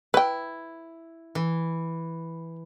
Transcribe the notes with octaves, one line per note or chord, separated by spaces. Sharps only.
E4 B4 G5
E3